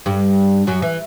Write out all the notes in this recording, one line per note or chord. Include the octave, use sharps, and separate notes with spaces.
G2 G3
F#2 F#3
E3